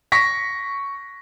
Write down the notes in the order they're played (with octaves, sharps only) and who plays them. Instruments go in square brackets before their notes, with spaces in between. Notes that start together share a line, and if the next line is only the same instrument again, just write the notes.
[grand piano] C#6 A#6 B6